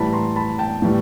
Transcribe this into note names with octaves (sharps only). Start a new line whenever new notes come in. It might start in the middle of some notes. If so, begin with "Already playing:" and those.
Already playing: A2 E3 G3 A5 B5
A#5 C6
A5 B5
G5 A5
A2 E3 G3